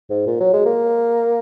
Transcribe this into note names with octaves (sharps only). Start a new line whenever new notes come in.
G#2
A#2
F#3
G#3
A#3